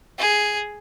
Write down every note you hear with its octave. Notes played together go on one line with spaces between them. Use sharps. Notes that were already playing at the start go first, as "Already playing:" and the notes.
G#4